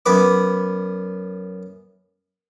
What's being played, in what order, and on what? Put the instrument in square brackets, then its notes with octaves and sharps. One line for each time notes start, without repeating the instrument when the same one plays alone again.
[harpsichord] F#2 B3 B4 D6